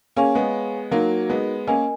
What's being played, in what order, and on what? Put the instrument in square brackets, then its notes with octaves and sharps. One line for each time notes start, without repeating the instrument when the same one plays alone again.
[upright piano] A#3 C#4 [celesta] G#4 C#5 F5 G#5 C#6
[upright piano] G#3 B3
[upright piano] F#3 A#3 [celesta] D#4 F#4 A#4
[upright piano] G#3 B3
[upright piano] A#3 C#4 [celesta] A#4 D#5 G#5